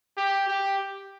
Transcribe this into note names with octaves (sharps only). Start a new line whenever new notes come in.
G4
G4